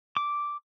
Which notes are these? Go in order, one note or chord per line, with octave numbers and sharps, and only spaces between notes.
D6